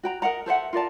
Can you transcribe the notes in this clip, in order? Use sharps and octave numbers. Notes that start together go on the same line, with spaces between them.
F#4 G5 A#5
A#4 D#5 F#5 A#5
A4 C5 E5 F#5
F4 A#4 D5 A5